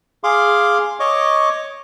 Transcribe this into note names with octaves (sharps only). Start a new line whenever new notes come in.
G#4 F5 C6 D6
C#5 D#5 C#6 D6